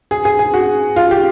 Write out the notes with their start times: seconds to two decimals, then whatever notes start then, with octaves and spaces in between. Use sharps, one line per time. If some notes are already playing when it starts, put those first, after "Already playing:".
0.11 G#4
0.25 G#4
0.39 G#4
0.54 F#4
0.96 F4
1.11 G4